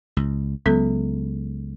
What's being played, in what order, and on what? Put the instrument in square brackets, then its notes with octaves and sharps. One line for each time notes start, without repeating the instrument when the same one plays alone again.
[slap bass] C#2
[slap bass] C#2 [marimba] F#3 B3 A4